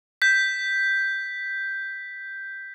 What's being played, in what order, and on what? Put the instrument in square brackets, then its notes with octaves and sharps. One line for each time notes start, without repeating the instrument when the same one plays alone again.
[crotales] G6 B6